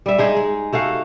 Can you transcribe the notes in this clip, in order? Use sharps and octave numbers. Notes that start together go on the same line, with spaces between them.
G3 E5
G#3 D#4 G#4
G#3
C3 A3 F#4 F5